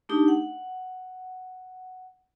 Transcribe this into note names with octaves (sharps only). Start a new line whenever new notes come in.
A3 D4 D#4 G4
F#5